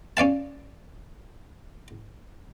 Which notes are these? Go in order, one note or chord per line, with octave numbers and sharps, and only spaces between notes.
C#4 D5 F5 A5